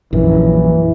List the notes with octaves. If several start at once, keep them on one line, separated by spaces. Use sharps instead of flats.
A#1 F#2 E3